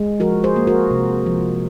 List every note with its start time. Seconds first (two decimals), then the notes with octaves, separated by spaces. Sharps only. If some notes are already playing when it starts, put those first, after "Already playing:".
Already playing: G#3
0.20 F3 F#4 A#4
0.44 G#4 C5
0.56 A#3
0.67 F#4 A#4
0.91 C3
1.26 F3